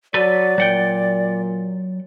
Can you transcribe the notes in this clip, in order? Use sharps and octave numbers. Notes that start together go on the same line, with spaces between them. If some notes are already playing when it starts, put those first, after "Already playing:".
F#3 A4 B4 D5
A#2 F#3 F#5 G5